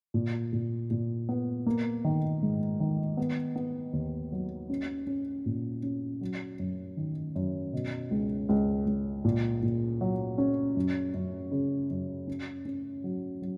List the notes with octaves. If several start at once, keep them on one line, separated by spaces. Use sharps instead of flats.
A#2
A#2
A#2
B3
A#3
D#3
G#2
D#3
B3
B3
D#2
F#3
C#4
C#4
A#2
C#4
F#3
F#2
D#3
F#2
B2
C#2
C#2
C#2
A#2
A#2
F#3
C#4
F#2
F#2
C#3
F#2
C#4
C#4
F#3
F#3